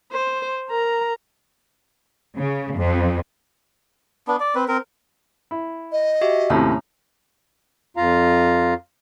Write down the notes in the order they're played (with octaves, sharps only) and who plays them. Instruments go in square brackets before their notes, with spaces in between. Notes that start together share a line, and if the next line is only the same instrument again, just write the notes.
[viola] C5
A#4 A#5
[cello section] C#3
F2
[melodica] B3 D4
D5
C4 B4
C4 A#4
[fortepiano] E4
[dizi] D#5
[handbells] F#4 G4 E5
[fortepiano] D#2 A2 C3 [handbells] A3 C#4 A#5
[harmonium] F2 F4 F5 A#5